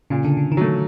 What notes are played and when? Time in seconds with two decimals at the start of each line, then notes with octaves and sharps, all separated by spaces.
0.10 A#2 C#3
0.24 D3
0.37 C#3
0.52 D#3
0.57 D3 F#3 A3